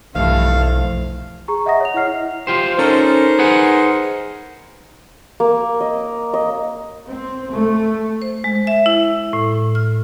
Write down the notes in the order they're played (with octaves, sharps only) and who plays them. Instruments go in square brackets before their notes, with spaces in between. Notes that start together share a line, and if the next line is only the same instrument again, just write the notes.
[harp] F1 [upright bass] B1 [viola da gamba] G2 E3 A3 [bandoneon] F5
[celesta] G#4 A#5 C#6
D#5 E5 F#5 A#5 D#6 A#6
C#5 F7
E4 D#5 F#5 F6 C7
[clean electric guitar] F4 G4 C5
[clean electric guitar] C#4 A4 [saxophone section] D#4 A#4 C5
[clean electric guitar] G#4 B4 F#5
[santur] A#3
D#5
D#5
[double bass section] C4
A3
[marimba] C5
G#3
E5
E4
A2
F6